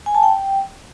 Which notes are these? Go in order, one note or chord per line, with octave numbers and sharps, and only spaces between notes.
G#5
A5
G5